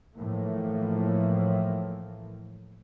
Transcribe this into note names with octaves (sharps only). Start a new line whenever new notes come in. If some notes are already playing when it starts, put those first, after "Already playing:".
A2 E3 F3 A3 A#3